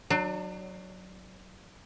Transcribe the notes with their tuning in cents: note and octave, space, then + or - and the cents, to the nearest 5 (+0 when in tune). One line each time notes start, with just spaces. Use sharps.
F#3 +0 D4 +35